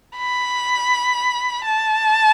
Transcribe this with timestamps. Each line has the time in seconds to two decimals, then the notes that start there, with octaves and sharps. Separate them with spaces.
0.17 B5
1.65 A5